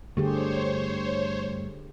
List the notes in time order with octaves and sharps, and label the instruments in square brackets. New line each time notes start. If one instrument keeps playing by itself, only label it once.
[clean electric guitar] G2 A3 [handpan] D3 G4 G#4 [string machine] C5 C#5